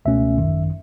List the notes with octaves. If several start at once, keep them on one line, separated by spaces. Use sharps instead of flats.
C#2 B2 A3 C#4 E5
G#1 F#2 D#3